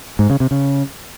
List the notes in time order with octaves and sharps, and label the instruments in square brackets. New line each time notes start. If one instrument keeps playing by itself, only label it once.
[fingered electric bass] G#2
C#3
C3
C#3